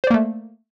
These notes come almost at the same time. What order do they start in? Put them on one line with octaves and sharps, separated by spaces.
C5 D5 A#3 A3